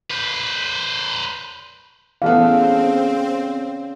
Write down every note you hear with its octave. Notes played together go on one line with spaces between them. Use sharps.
B4 C5
C#3 E3 A3 B3 C4 D4 F5